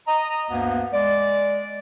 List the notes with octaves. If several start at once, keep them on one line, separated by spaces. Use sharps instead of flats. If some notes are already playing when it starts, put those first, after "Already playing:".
D#5 A#5
D2 G2 A#3 B3
G#3 D5